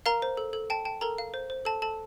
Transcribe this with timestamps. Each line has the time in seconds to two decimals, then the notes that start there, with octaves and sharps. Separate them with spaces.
0.06 A#4 F5 A#5
0.22 C5
0.37 A4
0.53 A4
0.70 G5 A5
0.85 G5 A5
1.01 A4 A#4 A#5
1.18 F5
1.34 C5
1.50 C5
1.65 A4 A5
1.82 A4 A5